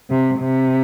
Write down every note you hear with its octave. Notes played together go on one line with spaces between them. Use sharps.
C3
C3